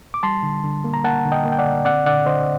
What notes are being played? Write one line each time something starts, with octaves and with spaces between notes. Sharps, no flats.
D6
G3 A5 C6
D3
D3
A#3
A#5
A#3 F#5 A5
D3
D#5 G5
A#3
G5
D5 F#5
D3
C4 D5 F#5
D3 D5 F#5
D3 C5 D#5